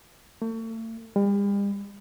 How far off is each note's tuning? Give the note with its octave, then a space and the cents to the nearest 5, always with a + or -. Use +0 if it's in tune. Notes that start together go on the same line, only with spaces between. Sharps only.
A3 +40
G3 +40